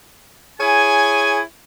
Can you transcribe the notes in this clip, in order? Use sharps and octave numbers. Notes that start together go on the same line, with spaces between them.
E4 G#4 C#5 G#5